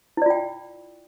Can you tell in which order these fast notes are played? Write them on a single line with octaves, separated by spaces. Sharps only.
E4 D5 F4 G5